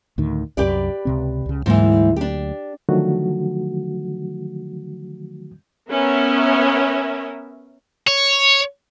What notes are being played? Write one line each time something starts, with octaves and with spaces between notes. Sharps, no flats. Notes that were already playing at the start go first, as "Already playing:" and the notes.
D2 A2 D#3
C2 F#2 G4 B4 D5
C#2 C3 C4
C#2 C#3
D2 G#2 E3 F#3 A#3
D4 G4
D3 D#3 F3 F#3 A3 F#4
B3 C#4 A#4 E5
C#5